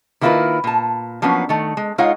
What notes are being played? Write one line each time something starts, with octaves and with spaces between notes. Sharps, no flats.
D#3 A#3 E4 F4 A#4 B4
A#2 A5
F3 F#3 A#3 B3 C#4 D4
D#3 A3
G#3
G#3 D#4 F4 C#5 F5 F#5